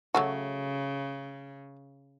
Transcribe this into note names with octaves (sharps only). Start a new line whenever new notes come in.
C#3 F#3 A3 F#4